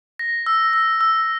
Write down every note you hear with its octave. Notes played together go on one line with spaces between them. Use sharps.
A#6
E6
E6
E6